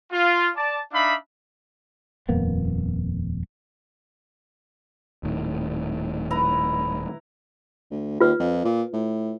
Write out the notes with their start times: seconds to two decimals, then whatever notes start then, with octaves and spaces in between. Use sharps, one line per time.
0.11 F4
0.55 D5 A5
0.93 D4 D#4 E5 F5 B5
2.29 D#1 F2 A#3 B3
5.23 D#1 A2 D#3
6.31 E4 B4 A#5
7.91 D2
8.21 D#2 F4 B4
8.39 F2
8.64 A#2
8.93 A2